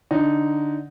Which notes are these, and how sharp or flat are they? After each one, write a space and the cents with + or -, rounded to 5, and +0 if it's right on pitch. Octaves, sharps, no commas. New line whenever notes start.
D3 +0 D#4 +0